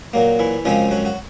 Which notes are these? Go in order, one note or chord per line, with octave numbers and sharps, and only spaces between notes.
A#2 F#3 A#3
E3 E4
F#2 C#3 F3 G#3 C4 F4
F#3 F#4
F#4